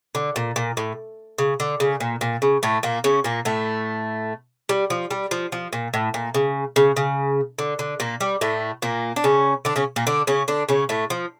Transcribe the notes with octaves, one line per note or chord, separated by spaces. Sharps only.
D3
A#2
A#2
A2
C#3
D3
C#3
A#2
A#2
C#3
A2 A3
A#2 A#3
C#3 C#4
A#2 A#3
A2 A3
G3
F3
G3
F3
F3
A#2
A2
A#2
C#3
C#3
C#3
D3
D3
A#2 A#3
G3
A2 A3
A#2 A#3
D4
C#3 C#4
D3 D4
C#3 C#4
A#2 A#3
D3 D4
C#3 C#4
D3 D4
C#3 C#4
A2 A3
F3